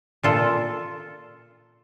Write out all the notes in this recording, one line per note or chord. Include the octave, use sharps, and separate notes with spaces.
A#2 F4 A4